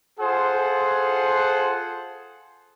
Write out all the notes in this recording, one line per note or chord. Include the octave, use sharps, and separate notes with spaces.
F4 G#4 A4 C5 F#5